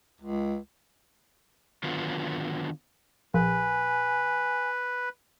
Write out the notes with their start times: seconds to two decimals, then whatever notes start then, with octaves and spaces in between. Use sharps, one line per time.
0.21 C#2
1.84 D3 D#3 F#3 B3 F4
3.34 A#1 B4 G#5